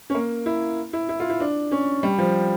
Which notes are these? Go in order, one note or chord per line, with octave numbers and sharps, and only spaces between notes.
C#4
A#3
E4
E4
E4
F4
E4
D4
C#4
G3
F3